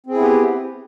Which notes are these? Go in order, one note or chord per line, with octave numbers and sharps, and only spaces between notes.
B3 C4 E4 G4 G#4